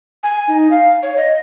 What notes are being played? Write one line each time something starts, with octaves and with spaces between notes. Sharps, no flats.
G#5
D#4
F5
C#5
D#5